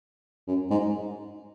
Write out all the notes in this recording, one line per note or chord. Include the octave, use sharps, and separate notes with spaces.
F#2
G#2